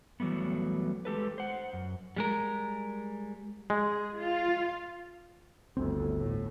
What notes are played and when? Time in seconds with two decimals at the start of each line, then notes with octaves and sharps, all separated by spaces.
0.20 E3 F#3 G3 A3 B3
1.05 G#3 G4 A4 B4
1.38 C5 F#5
1.73 F#2
2.17 G3 G#3 A#4
3.70 G#3 G#4
4.18 F4 F5
5.77 G1 D2 C4
6.18 A2